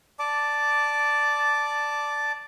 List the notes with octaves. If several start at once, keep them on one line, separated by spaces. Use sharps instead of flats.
D5 A5 D6